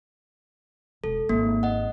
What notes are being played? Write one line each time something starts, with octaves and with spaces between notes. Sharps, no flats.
E1 A4
G#1 A#3
D#5 F#5